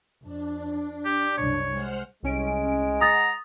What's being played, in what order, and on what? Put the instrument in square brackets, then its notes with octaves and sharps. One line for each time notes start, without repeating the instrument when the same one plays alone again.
[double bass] F2 [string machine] D4
[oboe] G4
[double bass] C2 F#2 [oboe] C#5
[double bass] G#3 [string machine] C5 F#5 F6
[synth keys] C2 C#4 D7 [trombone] G#3
[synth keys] F#5 [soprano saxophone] A#5 [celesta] D#6 A6